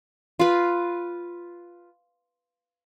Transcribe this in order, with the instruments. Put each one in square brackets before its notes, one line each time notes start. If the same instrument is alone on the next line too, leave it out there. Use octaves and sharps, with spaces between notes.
[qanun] F4 B4